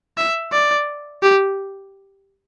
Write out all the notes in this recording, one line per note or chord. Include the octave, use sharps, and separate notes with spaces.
E5
D5
G4